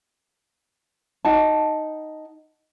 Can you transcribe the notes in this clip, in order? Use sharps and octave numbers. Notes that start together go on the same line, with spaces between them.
D#4 F#5 A5